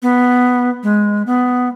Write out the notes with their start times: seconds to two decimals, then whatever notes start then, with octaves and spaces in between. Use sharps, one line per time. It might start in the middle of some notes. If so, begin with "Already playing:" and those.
0.02 B3
0.83 G#3
1.27 B3